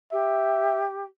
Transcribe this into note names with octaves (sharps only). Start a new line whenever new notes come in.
G4 E5